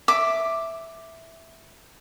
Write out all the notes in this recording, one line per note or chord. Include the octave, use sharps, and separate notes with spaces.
E5 D6